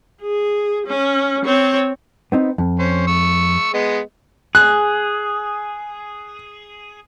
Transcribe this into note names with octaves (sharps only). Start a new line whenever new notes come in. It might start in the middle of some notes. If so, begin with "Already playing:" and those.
G#4
C#4
C4 C#5
B3 C4 D#4
F2
C#4 C5
C#6 E6
G#3 B3 D#5
G#4 F#6